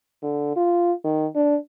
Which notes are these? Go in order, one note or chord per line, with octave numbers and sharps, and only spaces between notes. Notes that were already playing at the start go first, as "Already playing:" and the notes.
D3
F4
D#3
D4